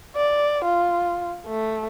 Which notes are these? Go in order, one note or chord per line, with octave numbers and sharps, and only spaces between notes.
D5
F4
A3